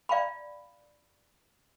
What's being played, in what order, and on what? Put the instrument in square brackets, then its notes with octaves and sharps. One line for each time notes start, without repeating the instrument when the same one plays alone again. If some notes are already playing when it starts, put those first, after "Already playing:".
[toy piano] D5 F5 G5 A#5 B5